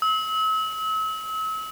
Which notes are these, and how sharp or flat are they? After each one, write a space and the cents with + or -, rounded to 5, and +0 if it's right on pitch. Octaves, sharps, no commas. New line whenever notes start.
E6 -40